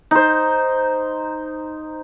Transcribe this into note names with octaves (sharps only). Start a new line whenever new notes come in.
D#4 C5